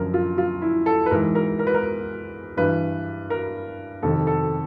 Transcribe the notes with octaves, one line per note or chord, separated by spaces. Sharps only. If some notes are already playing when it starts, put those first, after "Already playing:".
Already playing: F#2 D3 F3 A#4
F4
F4
E4
A4
B4
G#2 E3 A#4
A#4
A#4
B4
A#4
G2 E3 B4
A#4
F2 C3 D#3 A4
A4